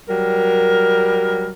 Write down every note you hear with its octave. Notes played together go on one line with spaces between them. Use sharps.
F#3 G3 A#4